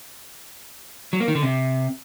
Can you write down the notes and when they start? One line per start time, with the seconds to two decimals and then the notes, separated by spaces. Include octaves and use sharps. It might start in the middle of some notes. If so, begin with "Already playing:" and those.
1.13 F#3
1.20 A#3
1.28 D#3
1.35 D3
1.43 C3